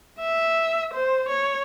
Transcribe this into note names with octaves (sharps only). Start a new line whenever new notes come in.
E5
C5
C#5